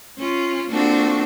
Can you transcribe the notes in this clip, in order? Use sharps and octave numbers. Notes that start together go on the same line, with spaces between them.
C#4 F4
A#3 C4 D4 F4 F#4 A4